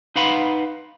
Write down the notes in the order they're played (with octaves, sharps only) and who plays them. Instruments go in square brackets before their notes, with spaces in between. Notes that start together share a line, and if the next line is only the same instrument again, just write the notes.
[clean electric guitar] D#4 B4 F5 F#5 B5 C6